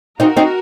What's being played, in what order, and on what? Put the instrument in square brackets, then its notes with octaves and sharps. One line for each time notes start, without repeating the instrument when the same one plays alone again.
[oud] C4 D#4 [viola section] F#4 A#4
[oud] C4 D#4